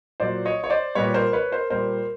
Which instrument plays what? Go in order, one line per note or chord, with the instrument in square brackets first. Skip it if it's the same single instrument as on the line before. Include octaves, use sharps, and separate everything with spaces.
[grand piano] A#2 F#3 C5 D5
C#5 D#5
C#5
C5 D5
A#2 G3 B4 C#5
A#4 C5
B4 C#5
A#4 C5
A#2 G3 A#4 C5